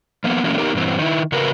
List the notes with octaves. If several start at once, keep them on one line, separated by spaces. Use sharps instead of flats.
F3 A#3 B3
E3 F#3 A3 A#3 C#4
B3 D#4 G4 A#4
G2 A#2 E3 C4
D#3 E4
C#3 F#4 A#4 B4